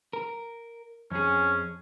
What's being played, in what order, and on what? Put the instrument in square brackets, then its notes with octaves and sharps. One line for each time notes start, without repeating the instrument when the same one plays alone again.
[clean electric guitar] A#4
[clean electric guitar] F2 G#4 [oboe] C#4